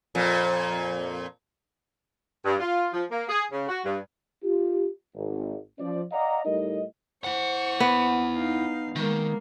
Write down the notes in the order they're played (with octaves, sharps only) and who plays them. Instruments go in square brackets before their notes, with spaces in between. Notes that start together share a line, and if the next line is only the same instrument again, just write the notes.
[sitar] F2 A#2
[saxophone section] G2
F4
F3
A#3
G#4
C#3
F#4
G2
[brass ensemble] F4 G4
G#1
F3 C#4 D5
D5 D#5 F5 F#5 A#5
A2 G3 D#4 A#4 D#5
[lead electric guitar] E4 F#5 [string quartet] C5 C#6
[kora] B3
[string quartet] D#4 F5
[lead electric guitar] D#3 [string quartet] G#3 A#3